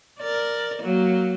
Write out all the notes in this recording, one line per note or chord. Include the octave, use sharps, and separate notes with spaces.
A#4 D5
F#3 A#3